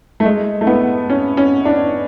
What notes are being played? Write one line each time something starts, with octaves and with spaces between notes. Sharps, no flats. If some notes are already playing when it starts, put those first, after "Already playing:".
A3
G#3
A3
B3
C#4
C#4
D4